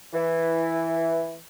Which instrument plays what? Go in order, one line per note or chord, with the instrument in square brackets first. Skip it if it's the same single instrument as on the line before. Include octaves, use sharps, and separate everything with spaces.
[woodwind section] E3